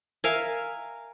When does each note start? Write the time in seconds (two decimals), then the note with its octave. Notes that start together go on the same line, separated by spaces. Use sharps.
0.24 A#4 E5 F5 G#5